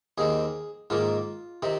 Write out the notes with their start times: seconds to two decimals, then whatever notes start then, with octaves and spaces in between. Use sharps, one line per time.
0.18 D#2 D#3 C4 G#4
0.90 G#2 D#3 A#3 F4
1.62 C3 D#3 C4